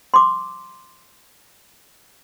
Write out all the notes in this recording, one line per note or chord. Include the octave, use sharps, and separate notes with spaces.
C6 D6